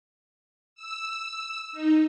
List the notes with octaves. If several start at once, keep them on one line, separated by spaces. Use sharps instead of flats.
E6
D#4